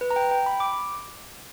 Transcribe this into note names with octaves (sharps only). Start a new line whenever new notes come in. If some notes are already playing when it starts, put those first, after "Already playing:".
B4
A#5
G5
G5
B5
D6